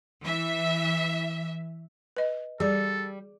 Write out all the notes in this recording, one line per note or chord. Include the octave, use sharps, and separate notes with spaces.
E3 E5
B4 D#5
G3 G#4 A4 D5